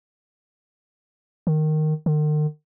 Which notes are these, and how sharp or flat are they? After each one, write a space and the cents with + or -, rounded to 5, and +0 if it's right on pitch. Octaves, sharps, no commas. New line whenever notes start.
D#3 -10
D#3 -45